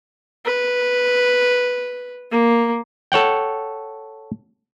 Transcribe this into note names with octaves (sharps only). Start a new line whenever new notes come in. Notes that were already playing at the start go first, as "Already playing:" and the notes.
B4
A#3
A4 C#5 F#5 G5